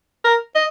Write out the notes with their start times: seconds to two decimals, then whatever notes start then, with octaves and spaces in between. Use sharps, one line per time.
0.24 A#4
0.55 D#5